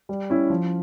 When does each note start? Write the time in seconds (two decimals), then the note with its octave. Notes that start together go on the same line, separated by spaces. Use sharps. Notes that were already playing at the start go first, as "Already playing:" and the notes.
0.09 G3
0.30 C#4 E4
0.50 F3